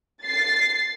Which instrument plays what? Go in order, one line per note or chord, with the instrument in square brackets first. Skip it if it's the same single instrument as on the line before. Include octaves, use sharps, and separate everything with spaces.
[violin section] A6 C7